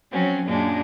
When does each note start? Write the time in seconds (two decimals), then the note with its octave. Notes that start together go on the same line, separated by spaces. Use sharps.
0.10 F3 F#3 C4 C#4
0.44 F#2 A#2 G#3 D4